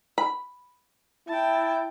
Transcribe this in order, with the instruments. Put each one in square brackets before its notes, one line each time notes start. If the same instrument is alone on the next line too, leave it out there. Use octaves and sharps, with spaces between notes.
[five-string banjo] B5
[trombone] E4 [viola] G5 A5